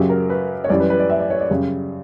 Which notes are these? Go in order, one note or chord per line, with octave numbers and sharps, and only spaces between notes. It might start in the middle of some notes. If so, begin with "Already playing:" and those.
Already playing: F#2 C#3 F#3 G4
A#4
B4
C#5
F#2 E3 G3 D5
B4
B4
D5
E5
D5
C#5
D5
F#2 C#3 G3